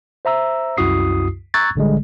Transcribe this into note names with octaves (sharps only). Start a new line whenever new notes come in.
C5 E5 A#5 E6
C2 F#2 E4 F#4 D#6 C7
A#5 C#6 E6 F#6 G#6 A6
A1 D3 G3 G#3